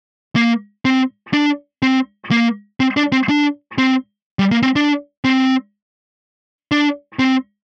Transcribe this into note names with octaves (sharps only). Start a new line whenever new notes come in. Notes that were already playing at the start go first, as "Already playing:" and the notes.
A#3
C4
D4
C4
A#3
C4
D4
C4
D4
C4
G3
A#3
C4
D4
C4
D4
C4